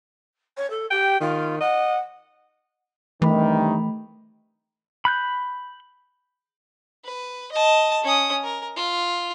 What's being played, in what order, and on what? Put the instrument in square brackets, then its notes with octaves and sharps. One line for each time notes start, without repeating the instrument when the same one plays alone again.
[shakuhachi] C#5
A4
[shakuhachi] G4 [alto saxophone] G5
[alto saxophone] D#3 [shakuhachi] F4
[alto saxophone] D#5 [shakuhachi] F#5
[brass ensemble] G2 C3 D#3 [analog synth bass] E3 [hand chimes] A3 B5
[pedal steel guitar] B5 F#6 G6
[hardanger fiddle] B4
D#5 A5
C#4 D#6
A#4
F4